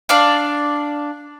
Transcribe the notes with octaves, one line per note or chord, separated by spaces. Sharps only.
D4 D5 F5